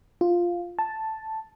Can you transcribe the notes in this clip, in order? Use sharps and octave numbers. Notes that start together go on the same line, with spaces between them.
F4
A5